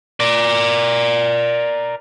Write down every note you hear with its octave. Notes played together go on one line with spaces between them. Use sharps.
A#4 D5